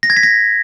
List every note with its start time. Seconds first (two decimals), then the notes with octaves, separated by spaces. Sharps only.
0.03 A#6
0.10 G#6
0.17 B6
0.23 A#6